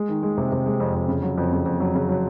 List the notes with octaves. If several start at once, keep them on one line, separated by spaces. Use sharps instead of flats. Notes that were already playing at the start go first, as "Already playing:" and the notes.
Already playing: G#3
D#3
G#3
C3
C3
G#3
F2
F2
C#3
F#3
F2
C#3
F2
F#3
C#3
F#3